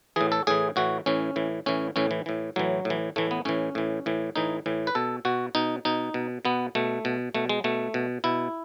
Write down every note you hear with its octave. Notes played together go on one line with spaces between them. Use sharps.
A2 E3 G#4
A4
A2 E3 G#4
A2 E3 F#4
A2 E3 C#4
A2 E3
A2 E3 C#4
A2 E3 C#4
E3
A2 E3
A2 E3 F#3
A2
E3
A2 E3 A3
B3
A2 E3 C#4
A2 E3
A2 E3
A2 E3 D#4
A2 E3
B4
B2 A4
B2 F#4
B2 D#4
B2 D#4
B2
B2 B3
B2 A3
B2
B2 A3
G#3
B2 A3
B2
B2 E4